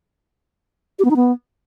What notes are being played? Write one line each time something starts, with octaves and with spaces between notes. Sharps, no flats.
G4
B3
D#4
B3